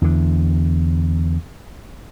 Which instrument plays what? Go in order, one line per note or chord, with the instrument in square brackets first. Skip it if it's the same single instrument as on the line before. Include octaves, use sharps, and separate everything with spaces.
[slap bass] E2 D3